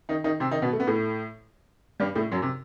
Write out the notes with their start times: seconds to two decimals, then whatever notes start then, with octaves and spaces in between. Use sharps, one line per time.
0.09 D#3 D#4
0.24 D#3 D#4
0.40 C3 C4
0.51 D#3 D#4
0.62 B2 B3
0.73 A3
0.80 B3
0.87 A2 A3
2.00 G2 G3
2.15 A2 A3
2.32 F#2 F#3
2.42 C3